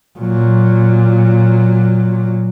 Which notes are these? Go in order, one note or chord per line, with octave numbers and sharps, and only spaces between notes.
A#2 F#3